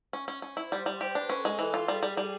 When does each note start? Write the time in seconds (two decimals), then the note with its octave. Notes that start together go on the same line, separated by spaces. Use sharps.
0.13 C#4
0.28 C#4
0.42 C#4 C5
0.57 E4
0.72 G3
0.86 G3
1.00 G4 B4
1.15 D4
1.29 C#4 A4
1.45 G#3
1.59 E3
1.74 F4
1.88 G3 G#4
2.03 G3
2.17 G3